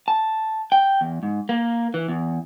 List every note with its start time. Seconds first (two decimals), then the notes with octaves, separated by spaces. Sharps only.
0.08 A5
0.72 G5
1.01 E2
1.23 G#2
1.49 A#3
1.94 E3
2.08 E2